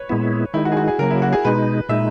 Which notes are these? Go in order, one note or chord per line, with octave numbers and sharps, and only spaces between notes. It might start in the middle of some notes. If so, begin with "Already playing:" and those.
Already playing: B4 C#5
A#2 G#3 B3 E4
D#3 G#3 D#4 E4
F#4
G#4
F#4
G#4
C#3 F#3 A#3 A#4
E4
F#4
G#4
B2 G#3 D#4 B4
A#2 G#3 D#4 E5